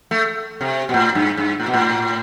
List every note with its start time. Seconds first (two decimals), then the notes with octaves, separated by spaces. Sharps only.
0.11 A3
0.61 C3
0.89 B2
0.94 A2
1.15 G2
1.37 G2
1.60 A2
1.66 B2
1.74 A2